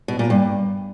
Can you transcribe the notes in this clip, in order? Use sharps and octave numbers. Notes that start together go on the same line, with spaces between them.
B2
A#2
G2